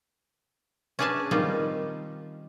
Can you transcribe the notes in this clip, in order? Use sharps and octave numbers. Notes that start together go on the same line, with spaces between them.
C#4 D4 G#4 B4 G#5 A5
D#3 G3 C4 D#4 F4